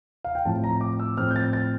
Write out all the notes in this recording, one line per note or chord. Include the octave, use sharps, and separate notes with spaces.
F5
G5
A2 F3 C4 A5
A#5
D6
E6
A2 F3 C4 F6
G6
A6
A6